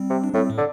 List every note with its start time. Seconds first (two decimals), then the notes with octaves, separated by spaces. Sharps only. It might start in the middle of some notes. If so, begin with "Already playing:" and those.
Already playing: G3 C4
0.10 C3
0.24 D4
0.33 A2 G3 C4
0.50 A2
0.58 D3